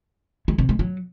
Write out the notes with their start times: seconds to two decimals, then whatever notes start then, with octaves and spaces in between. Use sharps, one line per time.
0.48 G#3
0.58 C3
0.69 G#3
0.79 F#3